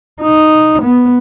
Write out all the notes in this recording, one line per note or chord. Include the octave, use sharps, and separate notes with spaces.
D#4
B3